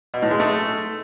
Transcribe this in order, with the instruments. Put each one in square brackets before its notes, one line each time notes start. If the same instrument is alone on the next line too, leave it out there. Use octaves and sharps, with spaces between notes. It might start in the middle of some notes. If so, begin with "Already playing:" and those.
[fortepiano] B2
A2
G#3
A3